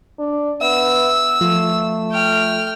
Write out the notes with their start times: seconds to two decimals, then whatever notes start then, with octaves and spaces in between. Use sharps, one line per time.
0.19 D4
0.61 B3 E5 E6
1.41 F3 A3 F4
2.11 G5 F6